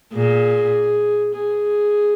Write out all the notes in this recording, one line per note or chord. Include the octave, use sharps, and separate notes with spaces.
A#2 G#4
G#4